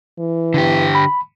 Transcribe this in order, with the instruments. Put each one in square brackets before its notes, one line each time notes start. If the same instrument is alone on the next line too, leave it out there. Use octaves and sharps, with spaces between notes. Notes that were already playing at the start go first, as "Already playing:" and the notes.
[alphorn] E3
[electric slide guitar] D3 G4
[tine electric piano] B5